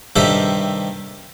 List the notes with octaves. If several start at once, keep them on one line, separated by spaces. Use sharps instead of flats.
G2 C3 D#3 G4 A4 E5